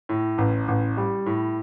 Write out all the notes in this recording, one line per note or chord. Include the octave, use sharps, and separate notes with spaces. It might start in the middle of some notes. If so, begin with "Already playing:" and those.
A2
A1
A1
G3
A2